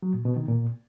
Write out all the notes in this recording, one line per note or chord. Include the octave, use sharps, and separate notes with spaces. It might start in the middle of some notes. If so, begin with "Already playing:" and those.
F#3
A#2
B2
D#3
A#2